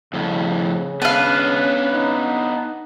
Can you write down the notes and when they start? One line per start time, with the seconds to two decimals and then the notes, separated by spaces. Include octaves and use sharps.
0.14 F2 A2 C#3
1.02 B3 C#4 D4 B4 F5
1.93 D#4